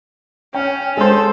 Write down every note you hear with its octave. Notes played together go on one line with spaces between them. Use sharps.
C#4 G5
G#3 A4 C5